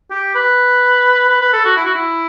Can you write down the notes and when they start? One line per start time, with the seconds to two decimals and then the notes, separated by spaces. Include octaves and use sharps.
0.11 G4
0.35 B4
1.29 B4
1.41 B4
1.53 A4
1.65 F#4
1.76 E4
1.85 F#4
1.95 E4